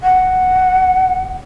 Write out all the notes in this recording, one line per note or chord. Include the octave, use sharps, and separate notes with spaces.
F#5